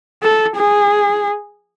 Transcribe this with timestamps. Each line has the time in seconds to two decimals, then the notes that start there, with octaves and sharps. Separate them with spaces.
0.23 A4
0.57 G#4